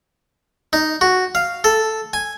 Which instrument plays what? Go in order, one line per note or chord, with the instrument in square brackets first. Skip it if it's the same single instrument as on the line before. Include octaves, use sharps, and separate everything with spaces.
[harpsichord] D#4
F#4
F5
A4
G#5